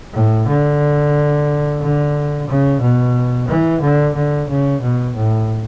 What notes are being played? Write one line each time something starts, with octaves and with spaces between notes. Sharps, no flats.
A2
D3
D3
C#3
B2
E3
D3
D3
C#3
B2
A2